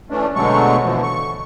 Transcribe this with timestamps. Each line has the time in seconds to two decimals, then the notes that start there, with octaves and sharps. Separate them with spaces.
0.10 E3 A3 C#4 D4
0.35 B2 D3 F#3 G#3 A3 C#6
0.84 B2 D3 E3 F3
1.03 C#6